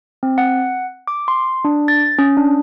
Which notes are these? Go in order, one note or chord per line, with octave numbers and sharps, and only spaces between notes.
C4
F#5
D6
C6
D4
A6
C#4
D4